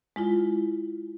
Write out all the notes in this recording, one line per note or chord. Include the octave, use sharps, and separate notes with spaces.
G#3 E4 F4